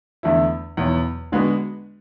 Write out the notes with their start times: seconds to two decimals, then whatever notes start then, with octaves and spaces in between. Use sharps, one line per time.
0.23 E2 D3 A3 E4
0.77 E2 B2 F#3
1.32 D3 G#3 B3 F#4